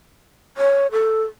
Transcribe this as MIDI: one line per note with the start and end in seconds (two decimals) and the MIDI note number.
0.57 0.87 73
0.92 1.22 69